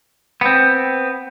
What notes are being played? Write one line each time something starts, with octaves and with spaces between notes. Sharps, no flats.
B3 C4